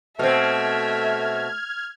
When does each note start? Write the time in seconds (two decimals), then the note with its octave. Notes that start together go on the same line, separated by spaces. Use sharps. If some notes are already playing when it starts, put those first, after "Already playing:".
0.19 B2 A3 C4 E5 F6 G#6